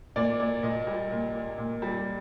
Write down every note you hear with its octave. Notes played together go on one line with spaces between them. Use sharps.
A#2 D5
A#3 D5
A#2 D#5
G3
A#2
A#3
A#2
G3